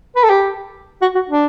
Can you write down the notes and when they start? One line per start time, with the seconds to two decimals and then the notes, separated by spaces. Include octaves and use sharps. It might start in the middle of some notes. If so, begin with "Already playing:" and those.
0.15 B4
0.23 A4
0.29 G4
1.01 F#4
1.15 F#4
1.29 D4